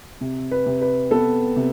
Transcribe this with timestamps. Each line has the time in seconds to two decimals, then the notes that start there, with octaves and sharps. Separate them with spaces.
0.21 C3
0.51 B4
0.66 C3
0.81 B4
1.11 B3 A4
1.56 C3